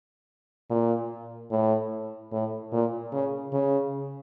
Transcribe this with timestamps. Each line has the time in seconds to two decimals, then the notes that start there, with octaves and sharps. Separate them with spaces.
0.70 A#2
1.51 A2
2.32 A2
2.72 A#2
3.12 C#3
3.53 C#3